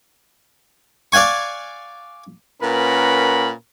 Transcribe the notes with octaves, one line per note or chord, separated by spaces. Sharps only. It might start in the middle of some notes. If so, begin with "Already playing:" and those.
D5 F5 F#5 G#5 C#6
A#2 C#4 A#4 B4 F#5 B5